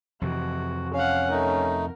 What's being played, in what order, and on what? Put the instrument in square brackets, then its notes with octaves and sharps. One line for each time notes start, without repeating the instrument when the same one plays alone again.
[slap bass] F2 C3 E3 [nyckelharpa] F#4
[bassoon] C#4 [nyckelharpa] F5 F#5
[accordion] A3 D#4 [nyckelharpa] A#4